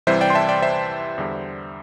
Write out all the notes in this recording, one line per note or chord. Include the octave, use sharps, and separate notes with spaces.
C2 C3 E3 G3 C5 E5
D5 G5
C6
E5 A5
D5 G5
C5 E5
E2 D3 G3